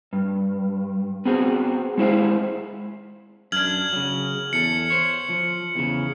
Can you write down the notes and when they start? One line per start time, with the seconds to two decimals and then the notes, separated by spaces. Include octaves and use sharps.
0.13 G2
1.25 B3 C4 F#4 G#4
1.98 G#3 E4 C5 F5
3.52 F#2 D4 F6 G#6 F#7
3.93 C#3 F#3
4.53 E2 A4 C#7
4.90 C5 C#5
5.29 F3
5.75 E2 A#2 C#3